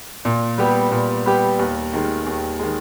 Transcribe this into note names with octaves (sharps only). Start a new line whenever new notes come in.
A#2
G3 B3 G4
A#2
G3 B3 G4
D#2
D#3 G#3
D#2
D#3 G#3